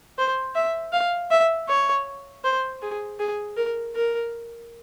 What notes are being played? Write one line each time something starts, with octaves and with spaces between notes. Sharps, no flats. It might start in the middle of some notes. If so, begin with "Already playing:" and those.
C5
E5
F5
E5
C#5
C5
G#4
G#4
A#4
A#4